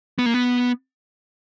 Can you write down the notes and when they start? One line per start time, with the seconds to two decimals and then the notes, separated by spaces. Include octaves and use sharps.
0.19 B3
0.26 A#3
0.34 B3